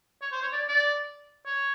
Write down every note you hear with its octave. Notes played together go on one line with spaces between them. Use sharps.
C#5
C5
C#5
D5
D5
C#5